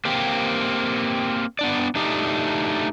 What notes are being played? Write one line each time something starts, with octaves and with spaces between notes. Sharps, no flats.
A#3 C4 G4
B3 D4 D5
A3 D4 D#4 G4